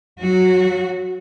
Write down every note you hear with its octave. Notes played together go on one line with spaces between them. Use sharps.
F#3 F#4